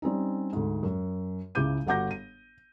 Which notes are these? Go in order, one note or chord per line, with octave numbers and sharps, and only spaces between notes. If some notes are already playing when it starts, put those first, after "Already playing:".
G3 C4 C#4 D#4
D2 G#2
F#2
C#2 C#3 E4 D6 G6 D#7
G1 F#4 F#5 D6 G6 A#6
D#7